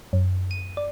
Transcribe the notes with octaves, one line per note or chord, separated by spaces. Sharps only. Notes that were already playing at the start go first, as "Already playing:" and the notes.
F#2
D#7
D5